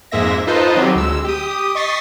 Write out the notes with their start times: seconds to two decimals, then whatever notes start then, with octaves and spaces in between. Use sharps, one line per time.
0.11 F2 G#2 G#3 A#3 E5 A#6
0.47 D#4 F4 A4 B4 C5 D#5
0.75 D#3 F#3 C4 F#4 G4
0.96 D2 G#3 E6
1.24 G4 D#6
1.75 D#5 C#6 D#6 A6 B6 C7